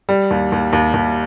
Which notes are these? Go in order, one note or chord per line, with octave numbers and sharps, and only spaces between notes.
G3
D#2
D#2
D#2
D#2